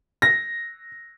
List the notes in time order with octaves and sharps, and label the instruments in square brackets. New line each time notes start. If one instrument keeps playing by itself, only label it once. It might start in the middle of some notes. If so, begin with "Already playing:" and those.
[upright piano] A#6